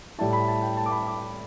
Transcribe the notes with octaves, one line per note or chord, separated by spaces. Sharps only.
A2 G3 E4 A5
B5
A5
G5
A5
D6
B5
D6